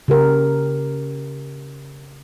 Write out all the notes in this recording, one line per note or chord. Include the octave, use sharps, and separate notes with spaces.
C#3 G4 A#4